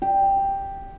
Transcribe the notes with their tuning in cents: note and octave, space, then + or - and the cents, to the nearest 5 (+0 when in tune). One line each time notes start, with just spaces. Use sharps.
G4 +5